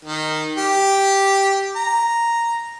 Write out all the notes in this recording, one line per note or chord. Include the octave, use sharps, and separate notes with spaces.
D#3
G4
A#5